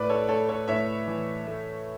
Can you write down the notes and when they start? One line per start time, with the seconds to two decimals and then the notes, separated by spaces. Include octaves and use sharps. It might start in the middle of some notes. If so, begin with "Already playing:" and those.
Already playing: A2 B4 D5
0.10 A4 C#5
0.29 A3 A4 C#5
0.49 A4 C#5
0.68 A2 C#5 E5
1.07 E3
1.46 A3